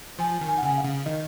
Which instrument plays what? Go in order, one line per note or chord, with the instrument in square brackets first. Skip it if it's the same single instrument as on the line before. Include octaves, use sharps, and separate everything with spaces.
[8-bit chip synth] F3 [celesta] G#5
[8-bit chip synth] D#3
[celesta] G#5
F#5
[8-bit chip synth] C#3 [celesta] G#5
[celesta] F5
[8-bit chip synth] C#3
[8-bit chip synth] D#3 [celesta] D#5